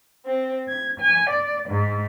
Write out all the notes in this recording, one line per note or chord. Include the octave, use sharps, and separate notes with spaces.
C4
G#6
G#5
D5
G#2